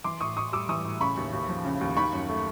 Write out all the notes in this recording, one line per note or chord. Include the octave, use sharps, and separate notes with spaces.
E3 C6 D6
A2 C#6 D#6
A2 C#6 D#6
G3 D6 E6
E3 C#6 D#6
A2
C#3 B5 C#6
D#2
D#2
F3
C#3
D#2
D#3 B5 C#6
F#2
A3